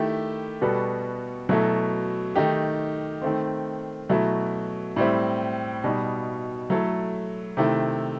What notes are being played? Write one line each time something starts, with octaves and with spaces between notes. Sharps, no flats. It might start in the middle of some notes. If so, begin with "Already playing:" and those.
Already playing: D#3 A3 E4 G4
B2 G3 B3 F#4 A4
B2 F#3 A3 E4 A4
D#3 A3 D#4 G4
D#3 A3 C4
B2 F#3 A3 E4
A2 G3 C4 E4
B2 G3 D#4
F#3 A3 E4 A4
C3 D#3 A3 E4